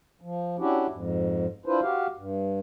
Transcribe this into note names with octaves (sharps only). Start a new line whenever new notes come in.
F3
C#4 D4 E4 F#4 G4
F2 G#2
D4 E4 F4 B4 C5
F#4 G4 F5
G2